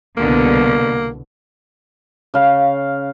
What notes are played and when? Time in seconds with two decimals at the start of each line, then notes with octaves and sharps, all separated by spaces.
0.17 C2 B2 D3 A#3
2.34 C#3 F5